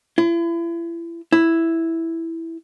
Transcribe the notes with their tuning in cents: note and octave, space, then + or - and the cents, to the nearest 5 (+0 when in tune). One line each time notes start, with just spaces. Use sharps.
E4 +35
E4 +0